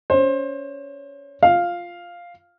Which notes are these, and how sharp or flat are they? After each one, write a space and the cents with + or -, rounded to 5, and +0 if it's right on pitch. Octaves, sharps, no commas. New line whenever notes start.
C#4 +25 C5 +25
F4 +0 F5 +0